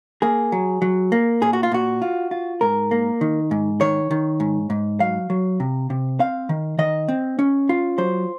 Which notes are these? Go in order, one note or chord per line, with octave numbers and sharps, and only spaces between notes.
A#3 G#4
F#3
F#3
A#3
A#2 G#4
F#4
F4
A#2 F#4
F4
F4
G#2 A#4
A#3
D#3
G#2
D#3 C#5
D#3
G#2
G#2
F#3 F5
F#3
C3
C3
C4 F5
D#3
D#3 D#5
C4
C#4
F4
F#3 C5